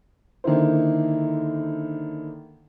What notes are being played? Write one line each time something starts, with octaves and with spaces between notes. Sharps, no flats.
D3 D#3 A#3 E4 C5